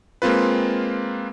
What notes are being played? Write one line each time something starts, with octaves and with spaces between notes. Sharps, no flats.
G#3 A#3 C4 F4 B4